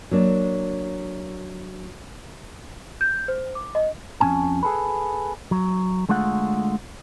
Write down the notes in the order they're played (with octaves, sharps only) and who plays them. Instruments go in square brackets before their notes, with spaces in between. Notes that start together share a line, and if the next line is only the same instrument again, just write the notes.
[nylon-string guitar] F#3 A#3 D4
[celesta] G6
C5
D6
D#5
[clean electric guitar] F2 F3 C#4 G#5 A5
G#4 A4 B4
F#3
D3 G#3 A3 F4 F#5